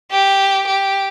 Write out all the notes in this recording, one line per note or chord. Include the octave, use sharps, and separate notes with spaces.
G4
G4